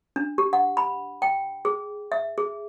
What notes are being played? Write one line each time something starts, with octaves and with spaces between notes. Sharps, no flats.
D4
G4
F#5
B5
G5
G#4
E5
G#4